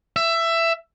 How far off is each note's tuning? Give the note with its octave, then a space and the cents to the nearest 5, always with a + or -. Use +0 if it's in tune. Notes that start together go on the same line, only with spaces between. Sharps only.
E5 +15